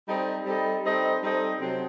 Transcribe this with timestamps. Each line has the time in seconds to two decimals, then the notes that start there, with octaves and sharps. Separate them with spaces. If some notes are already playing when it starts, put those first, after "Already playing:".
0.08 G3 C4 D#4 A4 D#5
0.46 G3 C4 D#4 A4 D#5
0.85 G3 C4 D#4 A4 D#5
1.23 G3 C4 D#4 A4 D#5
1.61 C3 F#3 C4